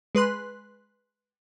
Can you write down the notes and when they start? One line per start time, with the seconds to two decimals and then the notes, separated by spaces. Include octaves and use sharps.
0.15 G#3 B4 C6 F#6